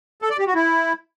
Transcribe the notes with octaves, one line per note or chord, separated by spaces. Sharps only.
A4
D5
G4
F#4
E4